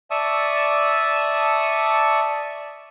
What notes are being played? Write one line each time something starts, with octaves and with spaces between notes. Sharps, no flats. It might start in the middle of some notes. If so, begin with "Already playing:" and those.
D5 E5 A5 C#6 D#6 E6